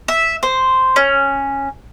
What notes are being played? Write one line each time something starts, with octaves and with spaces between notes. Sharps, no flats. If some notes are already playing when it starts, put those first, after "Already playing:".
E5
C5
C#4